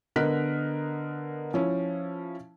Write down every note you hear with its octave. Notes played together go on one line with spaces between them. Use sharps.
D3 B3 A#4 D#5 F#6 B6
F3 C#4 E4